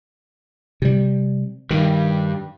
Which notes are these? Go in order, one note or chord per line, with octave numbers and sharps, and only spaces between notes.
C3 G3
G2 D#3